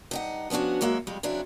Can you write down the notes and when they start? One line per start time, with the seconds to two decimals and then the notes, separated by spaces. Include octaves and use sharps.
0.11 G2 D#4 F#5
0.50 F3 B3 C#4 D4 F#4
0.81 F#3 G#3 A#3 F#4 E5
1.07 F2 G3 G#3
1.23 C#3 F#3 C4 D4 E4